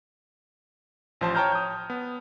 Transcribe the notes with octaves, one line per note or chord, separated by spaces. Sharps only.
A1 F3 C5 A5
C#5 G5 A5 A#5 F6 G6
D#6 G6
B3